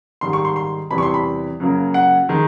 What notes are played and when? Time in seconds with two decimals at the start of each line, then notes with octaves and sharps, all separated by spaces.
0.21 G#2 D#3 G3 C6
0.33 C#6
0.45 C6
0.56 C6
0.91 E2 C3 E3 G3 B5
0.98 C#6
1.02 C6
1.14 B5
1.60 F#2 C#3 F#3 A#3
1.94 F#5
2.29 D#3 G#3